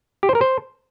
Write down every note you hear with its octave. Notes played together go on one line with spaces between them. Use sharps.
G4
C5
A#4
C5